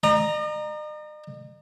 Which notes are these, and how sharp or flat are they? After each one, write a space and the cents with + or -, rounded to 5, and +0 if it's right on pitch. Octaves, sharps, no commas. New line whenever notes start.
D#5 -45 A#5 +0